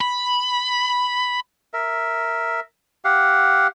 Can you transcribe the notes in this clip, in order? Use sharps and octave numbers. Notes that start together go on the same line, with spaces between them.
B5
A#4 E5
G4 F5 F#5